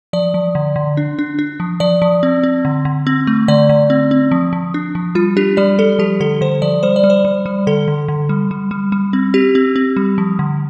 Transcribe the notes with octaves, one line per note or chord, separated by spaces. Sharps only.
F3 D5
F3
D3
D3
D4
D4
D4
F3
F3 D5
F3
C4
C4
D3
D3
C4
A3
D3 D5
D3
C4
C4
F3
F3
D4
F3
G3 F4
D4 G4
G3 D5
G3 A4
F3 G4
D3 A4
D3 C5
F3 D5
G3 C5
D5
G3
C5
G3
G3
D3 A4
D3
D3
G3
G3
G3
G3
C4
C4 G4
C4
C4
G3
F3
D3